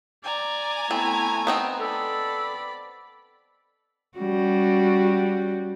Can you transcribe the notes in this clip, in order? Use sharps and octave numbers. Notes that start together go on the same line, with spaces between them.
D5 G#5 A#5
A3 B3 C4 E4
B3 C4 D#4 G5
A4 D5 B5
G3 C#4 F#4